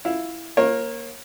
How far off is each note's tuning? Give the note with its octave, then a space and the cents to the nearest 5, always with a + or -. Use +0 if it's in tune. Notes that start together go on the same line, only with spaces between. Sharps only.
E4 +0 F5 +10
A#3 +5 C#5 -30